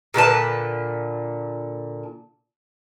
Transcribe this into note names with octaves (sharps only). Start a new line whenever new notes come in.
A#2 D3 B4 A5